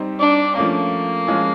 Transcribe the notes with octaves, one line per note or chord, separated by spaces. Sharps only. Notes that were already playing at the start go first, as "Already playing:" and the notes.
Already playing: G3 C4 D#4 G4 C5
D4
F3 A3 A#3 C#4
F3 G#3 C#4 F4 G#4